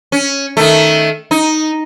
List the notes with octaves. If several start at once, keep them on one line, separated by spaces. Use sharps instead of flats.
C#4
D#3 A3
D#4